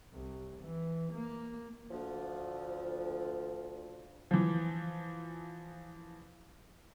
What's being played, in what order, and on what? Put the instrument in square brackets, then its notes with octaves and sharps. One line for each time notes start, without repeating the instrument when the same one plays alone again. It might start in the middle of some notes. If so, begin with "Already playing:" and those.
[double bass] C2
E3
A#3
[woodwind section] D2 F3
[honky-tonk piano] E3 F3